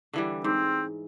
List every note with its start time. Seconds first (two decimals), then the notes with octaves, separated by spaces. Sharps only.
0.13 D3 E3 G3
0.44 G#2 C4